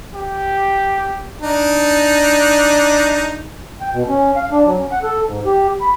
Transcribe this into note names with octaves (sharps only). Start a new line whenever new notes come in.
G4
D4 D#4
G5
B2
C#4
F5
D4
F#3
C#4
F#5
A4
G#2
G4
B5